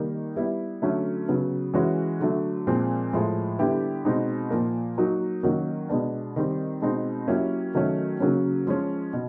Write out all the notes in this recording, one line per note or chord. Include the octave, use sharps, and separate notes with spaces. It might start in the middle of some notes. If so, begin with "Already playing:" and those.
Already playing: D#3 G3 A#3 D#4
G3 B3 E4
D3 F#3 A3 C#4
C#3 F#3 B3
E3 G#3 C#4 F#4
D3 F#3 A3
A#2 F3 G#3 C4
A2 F3 G#3
D3 G3 B3 E4 G4
B2 G#3 C4 D#4
A#2 F3 A#3
F#3 A#3 D#4 F#4
D#3 F#3 A#3 C#4 F#4
B2 G#3 B3 D4
D#3 G3 C4
B2 G#3 C4 D#4
F#3 A#3 C#4 E4 G4
D#3 F#3 A3 C#4
C#3 F#3 A#3 C#4
F3 G#3 C#4
B2